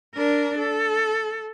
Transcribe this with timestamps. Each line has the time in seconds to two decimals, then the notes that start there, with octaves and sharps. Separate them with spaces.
0.15 D4 A#4
0.59 A4